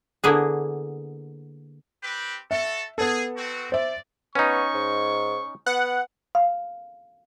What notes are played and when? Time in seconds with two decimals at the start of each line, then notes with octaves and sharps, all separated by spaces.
0.24 D3 A#3 B3 E4 G#4
2.03 C4 G4 B4
2.51 F#4 A4 E5
2.98 B3 G#4 A4
3.37 C4 F#4
3.72 C5 D5 E5
4.35 B3 C#4 D#4 C#6
4.74 G#2
5.66 B3 F#5
6.35 F5